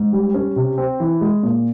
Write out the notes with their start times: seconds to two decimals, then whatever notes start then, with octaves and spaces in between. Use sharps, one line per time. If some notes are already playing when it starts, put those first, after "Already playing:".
Already playing: G#2
0.13 G3
0.34 C#4
0.56 C3
0.78 C4
1.00 E3
1.21 G#3
1.43 A#2